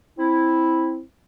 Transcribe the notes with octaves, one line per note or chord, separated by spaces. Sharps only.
C4 E4